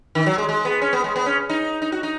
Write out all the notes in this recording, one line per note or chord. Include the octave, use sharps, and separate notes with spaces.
D#3
F#3
G#3
G#3
B3
C#4
B3
G#3
B3
C#4
D#4
D#4
F#4
D#4